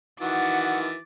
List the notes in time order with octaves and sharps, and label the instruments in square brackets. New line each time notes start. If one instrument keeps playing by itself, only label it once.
[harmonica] D#3 E3 F#4 [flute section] F#5 [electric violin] D6 A6